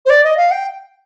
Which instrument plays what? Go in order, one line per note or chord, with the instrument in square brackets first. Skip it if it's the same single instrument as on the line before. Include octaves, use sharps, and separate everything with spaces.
[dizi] C5
D5
D#5
F5
G5